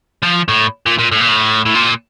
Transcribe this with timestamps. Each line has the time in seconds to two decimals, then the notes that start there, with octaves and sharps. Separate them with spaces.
0.22 F3
0.48 A2
0.86 A#2
0.99 A#2
1.12 A2
1.20 A#2
1.28 A2
1.66 A2
1.75 A#2